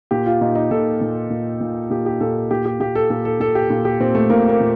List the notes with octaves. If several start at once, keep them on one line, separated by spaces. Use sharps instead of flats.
A#2 G4
F4
A#2 D#4
D#4
A#2 A4
A#2
A#2
A#2
A#2 G4
G4
A#2 A4
A#2 G4
G4
A#2 G4
A4
A#2 A4
A4
A#2 A4
G4
A#2
G4
A#2 C4
A3
A#2 A#3
A#3
A#2